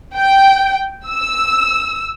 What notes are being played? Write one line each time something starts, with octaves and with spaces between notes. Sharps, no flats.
G5
E6